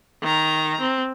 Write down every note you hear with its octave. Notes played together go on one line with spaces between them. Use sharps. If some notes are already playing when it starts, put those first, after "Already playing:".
D#3 A#5
C4